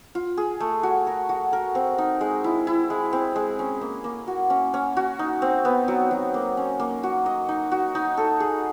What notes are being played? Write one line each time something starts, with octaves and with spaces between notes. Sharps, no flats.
F4
G#4
A3
F#4
A#4
F#4
A#4
C4
D#4
G#3
E4
E4
G#3
C4
G#3
C#4
A#3
A#3
F#4
C#4
C#4
F#4
D#4
C4
B3
F#3
F#3
A#3
C#4
A#3
F#4
D#5
D#4
F#4
D#4
A4
G#4